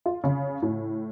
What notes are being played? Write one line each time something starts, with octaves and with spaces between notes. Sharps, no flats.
F4
C#3
A2